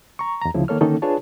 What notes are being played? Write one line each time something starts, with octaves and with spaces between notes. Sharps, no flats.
A#5 C#6
E2 A#5
D2 C#3 F3 E4
D#3 A#3 A4 C#5 F6
D3 D#3 A#3 C#4 D#4 A4
D4 F4 G#4 B4 C#5 A5